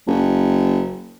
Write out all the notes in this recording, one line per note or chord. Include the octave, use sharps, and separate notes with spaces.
F#1